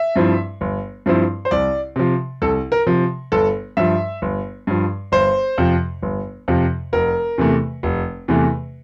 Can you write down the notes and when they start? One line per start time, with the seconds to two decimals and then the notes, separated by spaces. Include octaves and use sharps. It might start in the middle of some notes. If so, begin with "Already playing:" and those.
Already playing: E5
0.16 G2 F3 C4 E4
0.61 G1
1.06 G2 F3 C4 E4
1.45 C5
1.51 C2 D5
1.96 C3 F3
2.42 C2 A4
2.72 A#4
2.87 C3 F3
3.32 G1 A4
3.77 G2 F3 E5
4.22 G1
4.67 G2 F3
5.12 G1 C5
5.58 F2 C3 F3
6.02 G1
6.48 F2 C3 F3
6.93 F1 A#4
7.38 E2 C3 E3 A3
7.83 F1
8.28 E2 C3 E3 A3